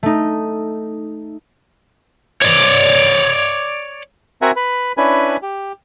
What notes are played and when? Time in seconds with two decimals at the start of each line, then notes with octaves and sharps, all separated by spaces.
0.03 A3 D#4
2.42 C#5 D5
4.42 C4 F#4 A#4 E5 F#5 G#5
4.56 B4
4.97 C#4 D4 E4 B4 G#5
5.42 G4